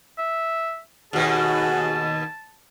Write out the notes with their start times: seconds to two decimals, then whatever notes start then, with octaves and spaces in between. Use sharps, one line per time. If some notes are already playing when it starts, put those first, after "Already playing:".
0.18 E5
1.13 D#2 B2 F#4 G#4 A5